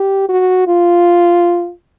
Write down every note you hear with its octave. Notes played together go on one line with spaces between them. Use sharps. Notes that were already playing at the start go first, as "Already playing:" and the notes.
Already playing: G4
F#4
F4